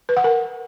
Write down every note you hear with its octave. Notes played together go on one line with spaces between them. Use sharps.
B4
F#5
A#4